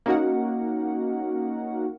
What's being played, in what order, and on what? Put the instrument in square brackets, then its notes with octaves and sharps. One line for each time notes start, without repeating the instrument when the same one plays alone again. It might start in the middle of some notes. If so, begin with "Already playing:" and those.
[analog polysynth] A#3 C#4 D#4 F#4 A#4 F#5